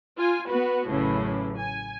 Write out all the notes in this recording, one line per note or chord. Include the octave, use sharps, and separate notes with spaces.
F4 G#5
B3 F#4 B4
A1 F#2 A2 C#3 E3
G#5